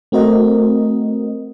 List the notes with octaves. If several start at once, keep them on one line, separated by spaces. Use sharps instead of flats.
A3 C4 F#4 A#4 D#5